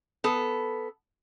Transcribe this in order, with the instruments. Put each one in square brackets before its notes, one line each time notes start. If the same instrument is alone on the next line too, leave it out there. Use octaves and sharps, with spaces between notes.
[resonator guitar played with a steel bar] B3 A4